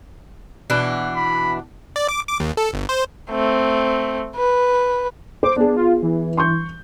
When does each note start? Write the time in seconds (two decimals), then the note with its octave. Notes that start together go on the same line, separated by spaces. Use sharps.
0.70 B2 E3 D4
1.16 B5
1.96 D5
2.09 D6
2.28 D6
2.40 D#2
2.57 A4
2.73 G1
2.89 C5
3.31 A3 C4
4.36 B4
5.43 C5 D6
5.56 B3 D4 G#4
5.77 F4
6.02 E3
6.37 C6 C#6 G6